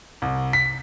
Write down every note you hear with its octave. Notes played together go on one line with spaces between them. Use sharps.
C2
B6